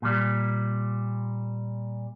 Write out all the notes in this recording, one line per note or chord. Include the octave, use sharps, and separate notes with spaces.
A#2 G3